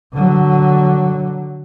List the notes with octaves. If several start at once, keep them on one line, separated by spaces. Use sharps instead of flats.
D3 F#3